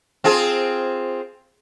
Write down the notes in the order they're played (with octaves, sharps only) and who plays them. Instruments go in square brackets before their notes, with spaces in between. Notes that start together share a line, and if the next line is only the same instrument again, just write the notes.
[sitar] C4 F4 G#4